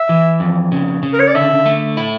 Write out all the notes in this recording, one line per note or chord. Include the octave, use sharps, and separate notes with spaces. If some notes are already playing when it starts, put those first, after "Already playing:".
Already playing: E5
E3
F2
C#3
C#3
A#4
C#5
D5
D3 E5
A3
E4